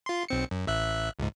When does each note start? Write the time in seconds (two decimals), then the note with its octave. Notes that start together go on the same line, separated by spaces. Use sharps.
0.06 F4 C6
0.29 B1 C4 C#7
0.51 F#2
0.67 A1 E5 F#6
1.19 C#2 G#2